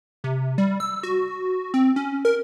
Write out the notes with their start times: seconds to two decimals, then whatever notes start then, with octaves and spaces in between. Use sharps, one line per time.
0.24 C3
0.58 G3
0.80 E6
1.03 F#4
1.74 C4
1.96 C#4
2.25 A#4